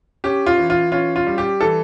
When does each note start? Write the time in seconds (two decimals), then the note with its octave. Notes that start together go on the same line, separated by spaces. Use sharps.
0.24 C#4 G4
0.46 F4
0.58 E3
0.70 F4
0.92 C#4 F4
1.16 F4
1.27 G3
1.38 G4
1.61 E3 A4